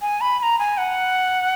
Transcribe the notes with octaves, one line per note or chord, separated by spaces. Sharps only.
G#5
B5
B5
A#5
G#5
F#5